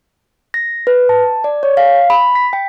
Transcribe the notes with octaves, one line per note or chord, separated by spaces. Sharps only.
A#6
B4
A5
D5
C#5
F5
B5
B6
G5